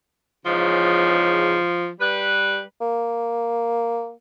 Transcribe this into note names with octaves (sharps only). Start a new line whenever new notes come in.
E2 G#2 C#3 F3
G3 B4
A#3